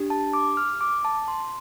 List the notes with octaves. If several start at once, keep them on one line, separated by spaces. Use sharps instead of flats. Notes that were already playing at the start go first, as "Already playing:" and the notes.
Already playing: D4 G4
A5
D6
F6
D6
A5
C6